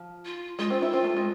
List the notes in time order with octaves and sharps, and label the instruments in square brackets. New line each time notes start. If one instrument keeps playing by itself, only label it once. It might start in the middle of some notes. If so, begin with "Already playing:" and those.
Already playing: [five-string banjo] F3
[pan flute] F4
[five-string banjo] G#3 [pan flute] F4
[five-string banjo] C4
C4 E4
C4
A3
G#3